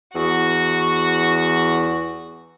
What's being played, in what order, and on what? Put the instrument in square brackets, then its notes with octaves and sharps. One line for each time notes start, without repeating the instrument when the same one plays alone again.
[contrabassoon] E2 [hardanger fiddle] F#4